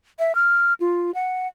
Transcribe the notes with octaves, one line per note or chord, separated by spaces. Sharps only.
E5
F6
F4
F#5